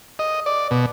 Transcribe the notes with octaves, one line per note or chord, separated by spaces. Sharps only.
D#5
D5
B2